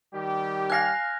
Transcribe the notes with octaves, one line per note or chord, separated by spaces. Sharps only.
D#3 G3 G4
F5 G#5 F#6 A#6